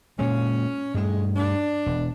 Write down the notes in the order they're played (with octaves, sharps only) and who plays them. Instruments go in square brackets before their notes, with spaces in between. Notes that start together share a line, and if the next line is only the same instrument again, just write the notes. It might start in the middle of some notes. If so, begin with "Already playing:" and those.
[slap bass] A#2 G#3 [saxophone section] C#4
[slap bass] G2 A3 [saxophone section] G#3
[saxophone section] D4
[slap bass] E1